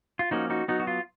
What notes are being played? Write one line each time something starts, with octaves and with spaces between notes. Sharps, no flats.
F4
F3 A#3 C#4 D#4 F#4
D#4 F#4
F#3 B3 D#4 F#4
F#4
F4